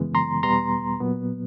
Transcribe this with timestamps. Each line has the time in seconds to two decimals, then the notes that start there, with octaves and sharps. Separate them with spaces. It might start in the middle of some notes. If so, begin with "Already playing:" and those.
Already playing: F#2 C#3 E3 G#3 B3
0.15 A#5 C6
0.43 E2 B2 G3 B3 A#5 C6
1.00 A#2 F#3 B3